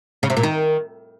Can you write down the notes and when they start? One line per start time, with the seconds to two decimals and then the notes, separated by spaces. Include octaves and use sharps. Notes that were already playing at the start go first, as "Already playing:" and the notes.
0.23 C#3
0.30 C3
0.37 A#2
0.43 D#3